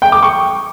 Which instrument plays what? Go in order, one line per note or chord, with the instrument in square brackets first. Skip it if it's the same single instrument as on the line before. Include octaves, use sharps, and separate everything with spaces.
[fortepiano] G5
D6
C#6